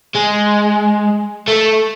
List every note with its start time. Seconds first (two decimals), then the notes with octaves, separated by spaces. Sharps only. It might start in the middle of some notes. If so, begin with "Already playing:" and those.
0.15 G#3
1.48 A3